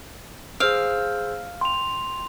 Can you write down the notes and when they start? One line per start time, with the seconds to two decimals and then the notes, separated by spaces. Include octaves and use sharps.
0.60 G#4 C5 F5 E6
1.61 G5 C6 F7